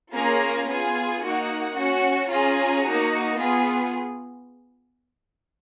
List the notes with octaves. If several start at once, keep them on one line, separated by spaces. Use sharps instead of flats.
A#3 C#4 F4 G#4 A#5
B3 F4 G#4 G#5
A#3 D#4 F#4 F#5
C#4 F#4
C#4 F4 G#4 A#5
A#3 D#4 F#4
B3 F4 G#4